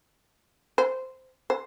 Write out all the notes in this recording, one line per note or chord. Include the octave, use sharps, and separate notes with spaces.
C5
C5